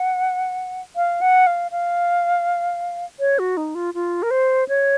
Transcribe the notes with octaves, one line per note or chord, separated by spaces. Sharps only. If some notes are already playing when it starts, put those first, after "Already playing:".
Already playing: F#5
F5
F#5
F5
F5
C#5
F#4
D#4
F4
F4
A#4
C5
C#5